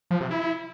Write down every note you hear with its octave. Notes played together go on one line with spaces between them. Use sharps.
F3
C3
E4